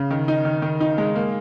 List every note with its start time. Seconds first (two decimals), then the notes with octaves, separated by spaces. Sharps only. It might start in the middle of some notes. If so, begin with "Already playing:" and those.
Already playing: C#3
0.10 D#3
0.28 D#4
0.45 D#3
0.62 D#3
0.80 D#4
0.98 G#3
1.15 A#3